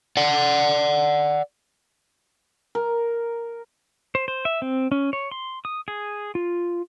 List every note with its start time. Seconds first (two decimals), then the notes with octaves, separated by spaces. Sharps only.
0.17 D5 F#5
2.75 A#4
4.15 C5
4.28 C5
4.45 E5
4.62 C4
4.92 C#4
5.13 C#5
5.31 C6
5.65 D#6
5.88 G#4
6.35 F4